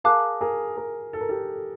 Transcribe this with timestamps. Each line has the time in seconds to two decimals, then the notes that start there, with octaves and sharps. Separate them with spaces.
0.04 G#4 A#4 F5 A5 D6 F#6
0.41 G#4 A#4
0.77 G#4 A#4
1.13 A4
1.21 A#4
1.29 G4 A4